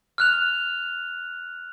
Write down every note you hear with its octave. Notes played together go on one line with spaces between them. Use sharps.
F6 F#6 F7